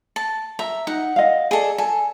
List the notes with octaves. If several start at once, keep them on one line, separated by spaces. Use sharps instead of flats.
A5
E5 A#5
D#4 F#5
D#5 F5
G#4 A4 D5
A4 G#5